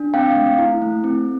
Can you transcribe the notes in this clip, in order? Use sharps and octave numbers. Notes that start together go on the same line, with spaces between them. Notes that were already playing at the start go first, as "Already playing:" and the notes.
Already playing: D4
C4 F5 G5
A3
E4
A3
C4